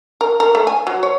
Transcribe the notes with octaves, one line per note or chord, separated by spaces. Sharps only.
A#4
A#4
A3
G#5
F#3
C#5